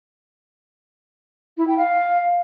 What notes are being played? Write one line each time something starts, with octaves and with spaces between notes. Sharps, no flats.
E4
G5
F5